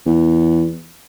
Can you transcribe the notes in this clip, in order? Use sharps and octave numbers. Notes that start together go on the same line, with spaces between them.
E2